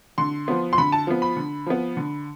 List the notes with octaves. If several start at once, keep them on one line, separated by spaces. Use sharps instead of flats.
D3 C6
F3 B3
C6
D3 B5
A5
F3 B3
B5
D3
F3 B3
D3